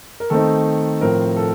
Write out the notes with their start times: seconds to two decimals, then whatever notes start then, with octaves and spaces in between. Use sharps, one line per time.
0.20 A#4
0.30 D#3 A3 C4 D#4 A4
1.01 A2 F3 C4 A#4
1.37 A4